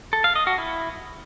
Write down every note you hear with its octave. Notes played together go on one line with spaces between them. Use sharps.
A4
F5
D#5
F#4
E4